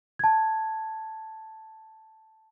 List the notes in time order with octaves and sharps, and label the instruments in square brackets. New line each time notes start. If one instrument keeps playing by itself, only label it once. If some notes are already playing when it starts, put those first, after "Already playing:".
[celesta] A5 G#6